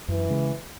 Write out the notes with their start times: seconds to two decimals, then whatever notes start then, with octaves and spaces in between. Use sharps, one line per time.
0.08 F#2 E3
0.30 C#3 G#3